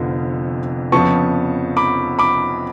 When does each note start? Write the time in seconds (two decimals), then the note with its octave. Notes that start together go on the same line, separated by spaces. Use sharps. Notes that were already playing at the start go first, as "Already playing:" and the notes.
Already playing: F1 F2 D3 F3 B3
0.92 F2 C#3 F3 B3 A5 C#6
1.77 B5 D6
2.19 B5 D6